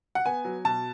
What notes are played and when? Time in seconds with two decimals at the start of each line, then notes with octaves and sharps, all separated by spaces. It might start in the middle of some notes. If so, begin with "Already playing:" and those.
0.15 F#5
0.26 B3 G#5
0.45 F#3
0.65 B2 A5